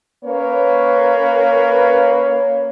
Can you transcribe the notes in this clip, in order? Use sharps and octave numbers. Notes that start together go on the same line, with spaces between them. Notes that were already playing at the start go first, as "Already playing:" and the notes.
A#3 C#4 B4 C#5